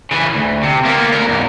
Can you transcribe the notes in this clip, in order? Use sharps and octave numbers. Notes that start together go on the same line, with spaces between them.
C#3 E3
D2
C3
A#3 B3
D2 A#4
E2 G#2